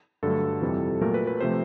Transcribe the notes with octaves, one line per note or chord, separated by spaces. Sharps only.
G2 D3 F#3 A3 A4
F2 C3 E3 G3
A#2 F#3 A3 A#4
B4
B4
C3 F3 A3 C5